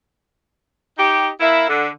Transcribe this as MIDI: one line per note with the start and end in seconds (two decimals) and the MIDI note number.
0.98 1.28 63
0.98 1.28 67
1.40 1.67 58
1.40 1.67 64
1.69 1.87 50